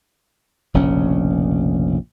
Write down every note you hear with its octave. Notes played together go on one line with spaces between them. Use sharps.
F1 A#1 C#3 C#4